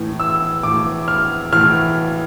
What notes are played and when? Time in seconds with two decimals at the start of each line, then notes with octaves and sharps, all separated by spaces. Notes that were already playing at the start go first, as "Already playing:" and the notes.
Already playing: A2 E3
0.20 E6
0.63 A2 E3 D6
1.08 F6
1.52 A2 E3 F6